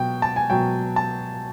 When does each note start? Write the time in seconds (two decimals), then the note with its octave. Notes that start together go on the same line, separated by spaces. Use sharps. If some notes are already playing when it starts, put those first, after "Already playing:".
Already playing: B2 F#3 G5
0.22 A5
0.36 G#5
0.50 B2 F#3 G5
0.96 A5